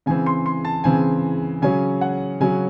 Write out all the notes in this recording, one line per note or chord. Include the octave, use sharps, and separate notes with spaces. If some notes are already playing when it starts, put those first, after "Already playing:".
C#3 E3 C4 G#5
C6
C6
A5
C#3 E3 C4 G#5
C#3 F#3 C#4 G#5
F#5
C#3 F#3 C#4 G#5